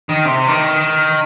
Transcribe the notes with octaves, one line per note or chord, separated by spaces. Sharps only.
D#3
C3
D#3